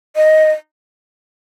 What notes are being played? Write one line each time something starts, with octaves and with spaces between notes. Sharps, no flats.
D#5